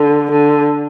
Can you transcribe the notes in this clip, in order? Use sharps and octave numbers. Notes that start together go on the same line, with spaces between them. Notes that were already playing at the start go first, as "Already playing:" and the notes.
Already playing: D3
D3